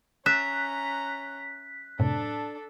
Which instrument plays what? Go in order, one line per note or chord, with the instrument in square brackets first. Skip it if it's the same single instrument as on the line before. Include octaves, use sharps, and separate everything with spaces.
[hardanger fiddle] C#4 A#5 [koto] E5 [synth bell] F#6 B6
[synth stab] F#2 A2 C3 [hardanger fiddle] D4 A4